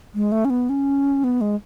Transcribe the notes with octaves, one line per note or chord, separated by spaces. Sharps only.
G#3
A3
C#4
B3
C#4
B3
G#3